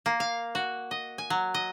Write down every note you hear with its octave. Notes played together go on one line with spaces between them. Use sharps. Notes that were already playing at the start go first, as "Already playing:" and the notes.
A#3
F5
F#4
D#5
G#5
F#3
D#5